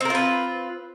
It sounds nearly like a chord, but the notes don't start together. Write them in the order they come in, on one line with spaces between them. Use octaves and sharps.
C4 A#4 F4 B4